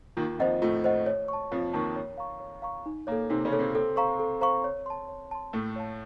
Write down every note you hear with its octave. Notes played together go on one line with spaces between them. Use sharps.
D#2 D#3 F4
F2 F3 C5 D#5 F#5
A2 A3 F4
C5 D#5 F#5
C#5
A5 C#6
F2 F3 C#5
D#2 D#3 A5 C#6
C#5
F5 A#5 C#6
C#5
F5 A#5 C#6
D#4
A#2 A#3 C#5
A4
C3 C4 D#4
C#3 C#4
A4 C#5
C3 C4
C3 C4 A4
C5 F5 A#5 C#6
A4
C5 F5 A#5 C#6
C#5
A5 C6
C#5
A5 C6
A2 A3 A4
C#5 F5 A5